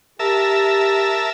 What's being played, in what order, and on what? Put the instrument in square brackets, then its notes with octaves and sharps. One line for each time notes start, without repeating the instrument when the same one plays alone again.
[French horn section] G4 [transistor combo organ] A#4 E5 A5